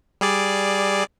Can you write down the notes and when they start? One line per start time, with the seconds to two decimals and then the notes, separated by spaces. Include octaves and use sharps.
0.21 G3 G#4 D5